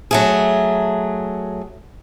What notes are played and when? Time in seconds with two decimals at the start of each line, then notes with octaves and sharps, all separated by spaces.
0.11 F#3 A3 G#4